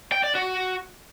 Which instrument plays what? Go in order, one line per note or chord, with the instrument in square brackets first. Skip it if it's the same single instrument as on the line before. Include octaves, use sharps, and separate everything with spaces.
[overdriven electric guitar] G5
D5
F#4